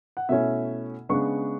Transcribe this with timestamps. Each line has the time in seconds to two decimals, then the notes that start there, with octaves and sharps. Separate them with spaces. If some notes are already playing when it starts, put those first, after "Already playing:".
0.17 F#5
0.29 B2 A3 C#4 E4 E5
1.09 C#3 G#3 B3 D4 C#6